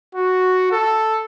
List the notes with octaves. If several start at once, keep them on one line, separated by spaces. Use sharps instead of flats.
F#4
A4